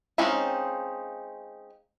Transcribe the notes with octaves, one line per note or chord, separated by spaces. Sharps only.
G#3 C4 C#4 D#4 F4